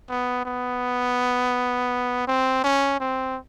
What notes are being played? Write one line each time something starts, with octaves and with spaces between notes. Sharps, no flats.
B3
B3
C4
C#4
C4